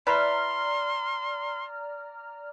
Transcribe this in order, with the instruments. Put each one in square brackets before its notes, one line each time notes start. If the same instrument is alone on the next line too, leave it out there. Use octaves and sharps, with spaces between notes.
[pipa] E4 B4 [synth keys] D5 A#5 F6 [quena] C6